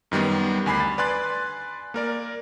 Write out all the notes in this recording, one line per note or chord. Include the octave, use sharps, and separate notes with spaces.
F#2 D#3 G3 B3
D2 G#5 B5 C7
A6
B4 D5 G#5 C6 F#6 A6
A#3 A#4 D5